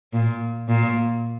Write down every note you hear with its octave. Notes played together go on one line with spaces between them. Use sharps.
A#2
A#2